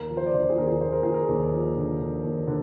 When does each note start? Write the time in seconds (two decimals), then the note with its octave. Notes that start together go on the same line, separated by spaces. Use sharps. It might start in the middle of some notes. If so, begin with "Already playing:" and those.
Already playing: D#2 A#4
0.10 F3
0.17 C5
0.26 D5
0.33 D3 C5
0.50 G#4
0.57 D#2 A#4
0.67 G#4
0.80 D#2 C5
0.93 A#4
1.03 D#2 G#4
1.14 A#4
1.28 D#2
1.52 F3
1.76 D3
1.99 D3
2.24 D#2
2.47 D3